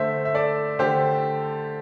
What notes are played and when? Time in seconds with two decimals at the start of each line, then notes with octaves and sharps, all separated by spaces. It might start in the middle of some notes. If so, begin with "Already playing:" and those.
Already playing: D3 A3 C5 E5
0.25 E5
0.34 A4 D5
0.79 D3 A3 G4 C5